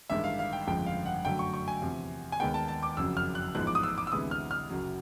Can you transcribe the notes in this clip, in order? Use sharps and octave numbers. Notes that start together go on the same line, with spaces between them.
A1 G2 D#3 G#3 E5
F5
F5
G5
G1 F2 C#3 F3 G#3 G5
F5
F#5
F#2 D3 F#3 A3 G5
C#6
C#6
G#5
E2 C3 F3
G#5
D#2 D#3 G#3 B3 G5
A5
A5
D6
F#1 F2 C#3 F#3 E6
F6
F#6
A1 G#2 F3 G#3 B3 F#6
D6
D#6
E6
D6
E6
D2 C3 E3 G#3 B3 D#6
F6
F6
F#1 F#2 C#3 F#3